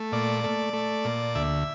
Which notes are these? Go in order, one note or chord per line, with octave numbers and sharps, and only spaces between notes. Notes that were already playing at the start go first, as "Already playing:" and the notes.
Already playing: A3
A#2 D5
A3
A3
A#2
D2 E5